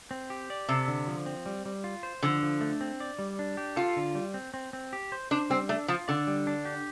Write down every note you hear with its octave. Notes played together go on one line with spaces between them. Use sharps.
C4
G4
D5
C3 A4
D3
F3
C4
G3
G3
F4
C5
D3 F3
F3
A3
C4
D5
G3
D4
G4
F4 A4
D3
G3
C4
C4
C4
G4
C5
D4 C5
G3 C4
A3 D4
F3 F4
D3 D5
G3
D4
G4